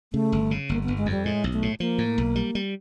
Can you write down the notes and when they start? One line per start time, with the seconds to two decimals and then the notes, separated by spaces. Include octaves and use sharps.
0.13 C#3 A3
0.32 G1
0.51 C#3
0.69 G1 A#3
0.83 B3
0.88 G1
0.97 G#3
1.06 F2
1.11 G3
1.24 A2 G#3
1.44 B1
1.53 A3
1.62 A2
1.80 F3 A#3
1.98 A2
2.18 B1
2.36 G3
2.55 G3